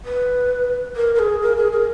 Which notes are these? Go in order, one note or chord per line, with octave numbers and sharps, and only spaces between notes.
B4
A#4
A#4
G#4
A#4
G#4
A#4